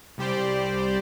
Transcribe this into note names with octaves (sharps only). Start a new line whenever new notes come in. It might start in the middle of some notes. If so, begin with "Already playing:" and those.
C2 G3 G4 C5 D5